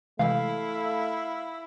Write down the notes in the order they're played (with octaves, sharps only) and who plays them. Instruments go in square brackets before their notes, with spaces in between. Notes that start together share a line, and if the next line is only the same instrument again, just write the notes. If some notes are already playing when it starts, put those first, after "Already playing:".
[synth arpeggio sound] C3 E3 G#3 [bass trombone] A3 [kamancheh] E4 [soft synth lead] F5